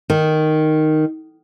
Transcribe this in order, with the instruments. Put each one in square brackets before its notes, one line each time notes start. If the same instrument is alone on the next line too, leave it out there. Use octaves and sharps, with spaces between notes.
[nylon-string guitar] D#3